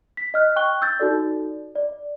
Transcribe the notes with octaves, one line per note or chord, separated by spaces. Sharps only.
B6
D#5 F6 F#6
G5 C#6 F#6 G7
E6 G6 A6
D#4 F#4 A4 D5
D5